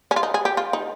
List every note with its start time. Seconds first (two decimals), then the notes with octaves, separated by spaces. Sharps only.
0.11 C#4
0.16 F4
0.23 D#4
0.34 G#4
0.45 G4
0.57 F4
0.73 D#4